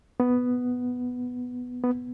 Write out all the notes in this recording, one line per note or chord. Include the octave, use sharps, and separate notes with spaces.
B3
B3